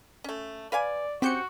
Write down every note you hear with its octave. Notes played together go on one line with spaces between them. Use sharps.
A3 C#4
B4 D5 F5 G#5
C4 C#4 F#4 G4 C5 G6 C#7